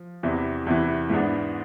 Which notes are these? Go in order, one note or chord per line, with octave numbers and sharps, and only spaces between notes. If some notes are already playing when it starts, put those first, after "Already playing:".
Already playing: F3
E2 C3 E3
E2 C3 E3
G#2 E3 G#3 B3 D4